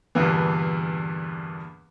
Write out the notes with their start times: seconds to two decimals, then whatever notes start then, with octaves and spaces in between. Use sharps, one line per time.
0.15 E2 G2 A#2 D3 E3